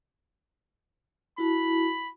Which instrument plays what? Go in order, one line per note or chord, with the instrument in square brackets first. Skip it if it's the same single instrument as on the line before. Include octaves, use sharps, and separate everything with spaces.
[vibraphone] E4 F#4 A5 [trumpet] B5